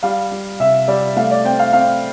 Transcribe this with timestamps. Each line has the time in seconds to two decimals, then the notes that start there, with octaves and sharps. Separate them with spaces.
0.03 G3 F5
0.31 G3
0.60 C3 E5
0.88 G3 D5
1.17 A3 F5
1.31 D5
1.45 C4 G5
1.59 F5
1.73 C4 F5